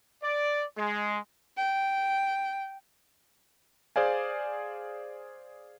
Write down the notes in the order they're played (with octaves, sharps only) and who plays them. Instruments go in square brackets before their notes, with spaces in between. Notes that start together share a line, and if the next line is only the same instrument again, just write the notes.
[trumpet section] D5
G#3
[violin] G5
[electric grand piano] G#4 C5 D5 F5 G#5